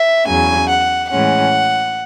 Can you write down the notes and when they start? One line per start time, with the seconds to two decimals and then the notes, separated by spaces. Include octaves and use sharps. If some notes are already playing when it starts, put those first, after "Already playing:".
Already playing: E5
0.26 E2 C#3 F#3 G#5
0.69 F#5
1.10 A2 E3 G#3 C#4 F#5